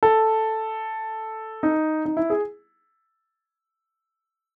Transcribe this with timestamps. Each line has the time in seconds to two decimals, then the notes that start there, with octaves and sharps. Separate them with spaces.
0.03 A4
1.63 D#4
2.06 D#4
2.17 E4
2.30 G#4